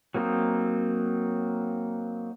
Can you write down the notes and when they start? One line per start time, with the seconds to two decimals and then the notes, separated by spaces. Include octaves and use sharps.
0.14 F#3 A#3 C4 D#4